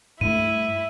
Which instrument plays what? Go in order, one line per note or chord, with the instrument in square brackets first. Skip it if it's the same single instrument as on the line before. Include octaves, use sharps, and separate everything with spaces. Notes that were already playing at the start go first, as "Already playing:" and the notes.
[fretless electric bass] G2 A3 [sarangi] E4 [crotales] D#7